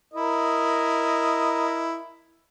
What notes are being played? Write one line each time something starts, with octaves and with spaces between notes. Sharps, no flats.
E4 A#4 D#5